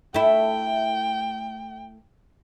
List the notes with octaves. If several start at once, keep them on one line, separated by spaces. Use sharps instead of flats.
A3 E4 G5